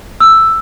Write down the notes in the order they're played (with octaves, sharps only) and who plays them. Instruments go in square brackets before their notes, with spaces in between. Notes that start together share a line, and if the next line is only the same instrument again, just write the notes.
[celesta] E6